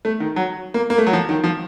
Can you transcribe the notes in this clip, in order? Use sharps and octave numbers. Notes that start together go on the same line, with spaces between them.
A3
D#3
F#3
A#3
A#3
A3
F#3
F3
D#3
F3